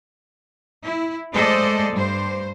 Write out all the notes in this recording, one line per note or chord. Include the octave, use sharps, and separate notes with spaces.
E4
G#3 A3 A4 C5 D5 D#5
G2 C5